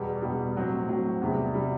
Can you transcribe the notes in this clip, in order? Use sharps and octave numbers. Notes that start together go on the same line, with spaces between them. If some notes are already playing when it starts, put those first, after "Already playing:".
Already playing: E2 B2 G3
E2 B2 G3
A2 F#3 C4
A2 F#3 C4
E2 C3 G3
C3 G3